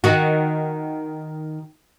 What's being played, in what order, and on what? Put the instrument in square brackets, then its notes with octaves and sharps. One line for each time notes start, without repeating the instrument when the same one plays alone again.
[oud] D#3 F#4